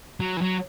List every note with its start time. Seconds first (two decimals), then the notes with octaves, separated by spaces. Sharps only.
0.20 F#3
0.37 E3
0.42 F#3